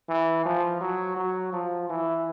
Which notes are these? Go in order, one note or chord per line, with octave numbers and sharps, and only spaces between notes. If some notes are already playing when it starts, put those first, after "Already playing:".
E3
F3
F#3
F#3
F3
E3